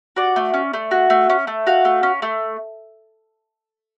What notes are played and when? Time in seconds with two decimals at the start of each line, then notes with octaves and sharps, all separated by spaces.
0.16 F#4 D5
0.36 A3
0.54 C#4
0.73 A3
0.91 F#4
1.10 A3
1.30 C#4
1.47 A3
1.67 F#4 F5
1.85 A3
2.03 C#4
2.22 A3